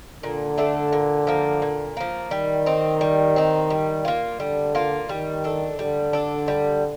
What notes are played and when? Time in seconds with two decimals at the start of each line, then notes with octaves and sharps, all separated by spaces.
0.23 A#2 D3
0.58 A3 D4 A4
0.93 A#2
1.27 F3 A#3
1.62 A#2
1.97 F3 A#3
2.31 D#3 G3
2.66 C4 D#4
3.01 G3
3.36 C4 D#4
3.70 G3
4.05 A#3 F4
4.40 D3 G3
4.75 A#3 F4
5.09 D#3 G3
5.44 D4 A4
5.79 D3 G3
6.13 D4 A4
6.48 G3